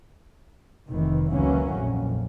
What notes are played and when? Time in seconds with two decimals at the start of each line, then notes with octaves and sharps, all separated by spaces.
0.89 F1 D#3 E3
1.31 C#2 E3 F#3 A#3 C#4
1.73 A#1 F2